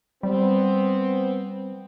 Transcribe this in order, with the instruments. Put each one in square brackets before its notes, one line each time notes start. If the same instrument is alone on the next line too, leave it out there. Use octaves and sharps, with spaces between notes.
[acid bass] G3 [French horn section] B3 C4